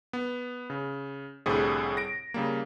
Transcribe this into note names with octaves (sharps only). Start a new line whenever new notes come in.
B3
C#3
C2 A2 D3 G3 C4 G#4
A#6 D7
C#3 G3 A#3